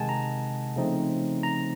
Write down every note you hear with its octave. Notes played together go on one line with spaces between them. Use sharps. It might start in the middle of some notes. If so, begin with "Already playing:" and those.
Already playing: C3 D#3 G#3 F#5 G#5 A5
A#5
C#3 F3 A3 C4 D#4
A#5